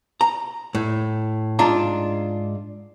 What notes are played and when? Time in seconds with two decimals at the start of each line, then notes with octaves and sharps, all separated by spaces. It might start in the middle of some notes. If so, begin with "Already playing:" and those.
0.21 A#5
0.75 A2
1.59 G#2 D4 F4 A#5